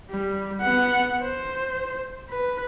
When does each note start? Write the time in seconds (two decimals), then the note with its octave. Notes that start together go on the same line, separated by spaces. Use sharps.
0.10 G3
0.61 B3 F#5
1.23 C5
2.31 B4